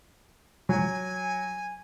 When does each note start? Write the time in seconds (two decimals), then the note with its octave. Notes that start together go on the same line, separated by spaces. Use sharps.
0.69 F#3 G#5